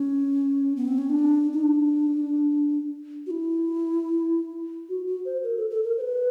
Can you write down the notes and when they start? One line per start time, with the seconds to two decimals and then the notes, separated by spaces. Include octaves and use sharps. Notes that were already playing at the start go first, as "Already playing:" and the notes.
Already playing: C#4
0.76 B3
0.88 C4
0.98 C#4
1.09 D4
1.53 D#4
1.64 D4
3.26 F#4
3.31 E4
4.89 F#4
5.07 F#4
5.25 C5
5.43 A#4
5.57 A4
5.70 A4
5.84 A#4
5.98 C5
6.01 B4